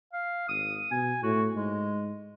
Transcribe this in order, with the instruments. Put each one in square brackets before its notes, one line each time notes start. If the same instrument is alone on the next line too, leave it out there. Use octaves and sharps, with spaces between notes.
[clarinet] F5
[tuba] G#1 [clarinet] D#6
[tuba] B2 [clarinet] G#5
[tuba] A2 [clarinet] F#4
[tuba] G#2 [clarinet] G#3